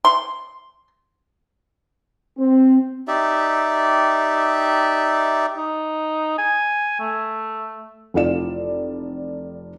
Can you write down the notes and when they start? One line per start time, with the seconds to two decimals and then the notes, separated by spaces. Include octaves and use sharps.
0.05 C6
2.38 C4
3.08 D#4 G4 D5 E5
5.57 D#4
6.38 G#5
7.00 A3
8.14 F1 E3 F4 D5 E7